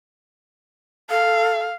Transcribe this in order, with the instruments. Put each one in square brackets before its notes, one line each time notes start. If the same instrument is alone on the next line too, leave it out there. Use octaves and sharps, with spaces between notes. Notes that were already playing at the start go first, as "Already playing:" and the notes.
[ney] A4 [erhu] F5